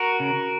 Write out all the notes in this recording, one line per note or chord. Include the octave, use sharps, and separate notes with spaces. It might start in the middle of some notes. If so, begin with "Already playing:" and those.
Already playing: F#4 A#4
C#3